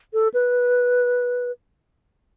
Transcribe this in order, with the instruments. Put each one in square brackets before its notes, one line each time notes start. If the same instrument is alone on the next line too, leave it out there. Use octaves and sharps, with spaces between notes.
[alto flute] A4
B4